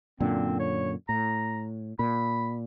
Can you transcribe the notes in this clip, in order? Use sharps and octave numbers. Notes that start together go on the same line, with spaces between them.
F#2 A#2 D3 C4
C#5
A2 A#5
A#2 B5